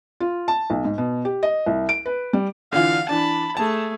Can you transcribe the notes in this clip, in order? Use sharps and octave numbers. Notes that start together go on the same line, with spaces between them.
F4
A5
B1
G#2
B2
G4
D#5
C2
D7
B4
G3
D3 E3 F4 F5
E3 D4 A5 B5
A3 G#4 A5